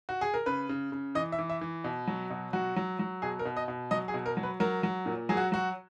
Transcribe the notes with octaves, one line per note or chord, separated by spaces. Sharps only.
F#4
G#4
A#4
C#3 B4
C#3
C#3
E3 D#5
E5
E3
E5
E3
B2
F#3
B2
F#3 F#4
F#3
F#3
B2 G#4
A#4
B2
D#5
B2
F#3 D#5
G#4
B2
A#4
F#3
B4
F#3 A#4
F#3
A#2
F#3 G#4
F#4
F#3 F#4